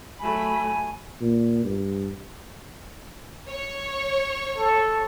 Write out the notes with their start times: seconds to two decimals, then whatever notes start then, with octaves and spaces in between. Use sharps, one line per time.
0.20 F#3 A3 G#5 B5
1.21 A#2
1.64 G2
3.48 C#5 C#6
4.58 A4